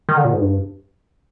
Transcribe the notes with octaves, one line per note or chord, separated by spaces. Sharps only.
D#3
D3
A#2
G#2
G2